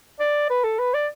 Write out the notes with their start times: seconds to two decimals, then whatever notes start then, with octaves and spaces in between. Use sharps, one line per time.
0.20 D5
0.50 B4
0.64 A4
0.79 B4
0.94 D5